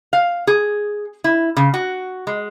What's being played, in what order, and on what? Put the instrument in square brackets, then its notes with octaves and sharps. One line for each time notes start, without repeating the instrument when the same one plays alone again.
[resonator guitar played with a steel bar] F5
G#4
E4
C#3
F#4
G#3